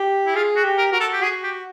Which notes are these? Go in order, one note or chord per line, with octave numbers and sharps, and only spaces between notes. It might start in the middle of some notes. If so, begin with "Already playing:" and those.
Already playing: G4
E4
F4 G#4
F#4
G4
A#4
F#4 A#4
A4
G4
F#4 G#4
G4